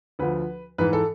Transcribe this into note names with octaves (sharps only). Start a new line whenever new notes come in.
D2 D3 F3 B4
G#2 E3 B4
A4